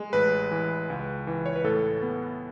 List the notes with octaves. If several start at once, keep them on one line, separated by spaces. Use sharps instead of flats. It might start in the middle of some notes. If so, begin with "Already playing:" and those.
Already playing: G#3
A1 B4
E3
C#2
E3
C#5
B4
A2 A4
B3